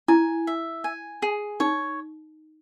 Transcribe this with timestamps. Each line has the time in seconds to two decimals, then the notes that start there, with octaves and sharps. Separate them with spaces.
0.08 E4 G#5
0.47 E5
0.84 G#5
1.22 G#4
1.60 D#4 C#5